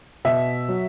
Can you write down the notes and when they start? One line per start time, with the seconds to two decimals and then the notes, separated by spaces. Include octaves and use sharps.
0.25 B2 E5
0.69 F#3